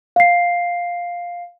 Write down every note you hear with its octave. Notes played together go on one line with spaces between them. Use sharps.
F5 C7